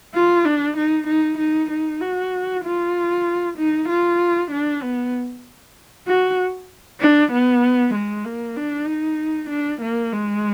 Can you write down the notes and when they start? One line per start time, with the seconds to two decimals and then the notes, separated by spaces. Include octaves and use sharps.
0.14 F4
0.45 D4
0.77 D#4
1.07 D#4
1.39 D#4
1.70 D#4
2.01 F#4
2.64 F4
3.58 D#4
3.89 F4
4.51 D4
4.82 B3
6.07 F#4
7.01 D4
7.32 B3
7.94 G#3
8.25 A#3
8.56 D4
8.87 D#4
9.50 D4
9.81 A#3
10.13 G#3